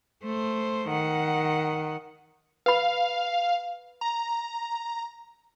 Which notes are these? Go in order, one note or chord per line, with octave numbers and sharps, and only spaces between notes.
A3 C5
D#3 F#5
B4 F5 B5
A#5